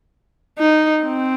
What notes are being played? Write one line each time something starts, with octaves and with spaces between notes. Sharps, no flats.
D#4
C4